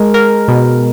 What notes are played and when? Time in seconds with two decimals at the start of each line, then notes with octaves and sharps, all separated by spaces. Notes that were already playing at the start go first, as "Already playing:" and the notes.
Already playing: G#3 A#4
0.14 A#4
0.48 B2